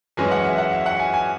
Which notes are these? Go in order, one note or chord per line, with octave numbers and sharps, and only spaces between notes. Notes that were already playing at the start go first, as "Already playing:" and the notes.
F#2 E3 G#3 C#4 G#5
F#5
E5
F#5
E5
F#5
G#5
G#5